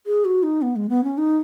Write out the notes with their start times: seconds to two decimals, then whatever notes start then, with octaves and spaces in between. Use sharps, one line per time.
0.06 G#4
0.25 F#4
0.43 D#4
0.62 B3
0.76 G#3
0.89 B3
1.04 C#4
1.18 D#4